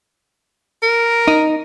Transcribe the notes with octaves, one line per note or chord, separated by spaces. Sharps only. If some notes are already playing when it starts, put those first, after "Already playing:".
A#4
D#4